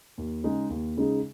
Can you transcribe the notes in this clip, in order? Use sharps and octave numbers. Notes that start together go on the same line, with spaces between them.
D#2
C#3 G#3 D#4 G#4
D#2
C#3 G#3 D#4 G#4